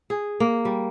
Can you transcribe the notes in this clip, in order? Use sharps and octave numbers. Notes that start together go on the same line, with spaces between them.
G#4
A#3
G3